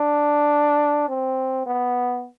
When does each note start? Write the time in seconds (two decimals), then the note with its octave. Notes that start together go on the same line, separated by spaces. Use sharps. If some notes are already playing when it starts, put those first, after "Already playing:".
Already playing: D4
1.08 C4
1.66 B3